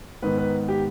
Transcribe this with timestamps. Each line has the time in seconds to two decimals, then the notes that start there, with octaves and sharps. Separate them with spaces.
0.23 G#2 D#3 B3 B4
0.38 B4
0.68 G4